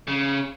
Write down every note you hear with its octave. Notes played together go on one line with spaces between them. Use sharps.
C#3